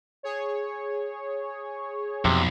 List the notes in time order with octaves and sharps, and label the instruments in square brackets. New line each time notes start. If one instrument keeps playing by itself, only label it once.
[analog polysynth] G#4 C#5
[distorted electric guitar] B1 [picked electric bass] F2 [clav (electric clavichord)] C3